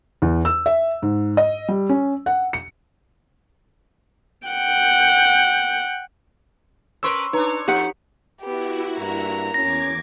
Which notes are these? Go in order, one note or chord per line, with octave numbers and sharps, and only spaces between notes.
E2
E6
E5
G#2
D#5
G3
C#4
F#5
C#7
F#5 G5
C#4 A#4 B4 C6 C#6 E6
D4 D#4 B4 C#5 A#5
F2 D#4 G4 B4 F#5
B3 E4 F#4 G4
G2 A#3 A#5
E2 C#4 D6 G#6 A#6